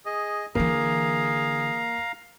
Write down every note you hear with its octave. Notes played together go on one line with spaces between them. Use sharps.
G#4 D#5
D3 E3 A#3 G#4 F5 A#5